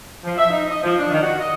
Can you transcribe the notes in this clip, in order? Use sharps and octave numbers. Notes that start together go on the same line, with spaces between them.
F3
E5
D#4
D#5
F3
D4
D#3
F#4
D#5